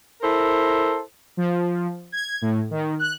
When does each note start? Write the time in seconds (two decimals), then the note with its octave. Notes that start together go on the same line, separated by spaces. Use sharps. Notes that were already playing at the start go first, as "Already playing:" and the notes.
0.21 E4 A4 A#4 C5
1.37 F3
2.12 G#6
2.42 A2
2.71 D#3
2.99 F#6